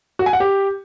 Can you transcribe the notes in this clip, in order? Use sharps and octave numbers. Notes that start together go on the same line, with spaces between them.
F#4
G#5
F#5
G4